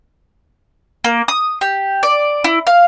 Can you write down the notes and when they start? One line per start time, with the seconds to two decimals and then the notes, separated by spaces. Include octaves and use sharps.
1.04 A#3
1.28 D#6
1.61 G4
2.03 D5
2.44 E4
2.67 F5